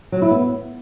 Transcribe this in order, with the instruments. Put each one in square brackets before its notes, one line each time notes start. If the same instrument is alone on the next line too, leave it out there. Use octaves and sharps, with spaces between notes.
[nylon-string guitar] F#3
E4
B3